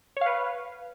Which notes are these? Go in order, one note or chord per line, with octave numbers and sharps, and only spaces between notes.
B4 C#5 F5